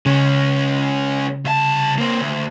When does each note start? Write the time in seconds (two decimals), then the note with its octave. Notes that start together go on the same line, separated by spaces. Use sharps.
0.06 C#3 G#3 C#4
1.45 C2 A5
1.98 A#3 C4
2.21 D2